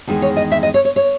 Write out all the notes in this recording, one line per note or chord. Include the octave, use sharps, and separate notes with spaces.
E2 D#3 G#3
C#5
D#5
E5
D#5
C#5
C#5
C#5